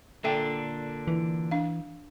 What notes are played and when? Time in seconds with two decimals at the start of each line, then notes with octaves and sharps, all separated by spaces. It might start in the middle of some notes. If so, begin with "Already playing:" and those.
0.24 A#2 D3 D4 A4 E5 G5
1.07 E3
1.51 D4 F5